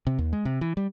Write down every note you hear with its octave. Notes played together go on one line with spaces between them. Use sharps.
C3
D#2
G#3
C3
E3
G3